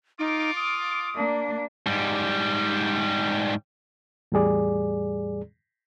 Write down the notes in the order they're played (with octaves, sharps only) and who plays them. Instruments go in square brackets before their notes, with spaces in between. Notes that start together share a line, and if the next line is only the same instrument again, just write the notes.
[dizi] D#4 [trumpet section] F4 D6
[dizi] D#6
[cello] A#3 D4
[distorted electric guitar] G#2 G3
[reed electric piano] E2 A2 G3 G#4 D5